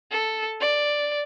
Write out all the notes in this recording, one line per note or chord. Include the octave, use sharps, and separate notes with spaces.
A4
D5